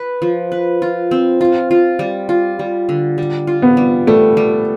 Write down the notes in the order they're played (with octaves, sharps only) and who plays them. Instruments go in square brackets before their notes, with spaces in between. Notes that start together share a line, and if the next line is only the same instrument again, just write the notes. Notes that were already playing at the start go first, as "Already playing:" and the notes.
Already playing: [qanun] B4
F3
B4
F4
C4
F4
F4
G3
F4
G3
D3
G3
F4
[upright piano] B3
[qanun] G3
[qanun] G3 [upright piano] A3
[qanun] G3